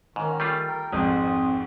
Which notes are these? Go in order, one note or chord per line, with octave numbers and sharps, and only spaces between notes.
G#2 D#3 C#4
G3 A3 F4
A#4 G5
G#1 F2 G#2 C4 D#6